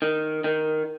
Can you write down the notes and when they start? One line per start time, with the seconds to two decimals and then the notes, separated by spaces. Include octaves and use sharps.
0.02 D#3
0.44 D#3